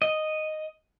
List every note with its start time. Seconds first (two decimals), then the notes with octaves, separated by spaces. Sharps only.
0.02 D#5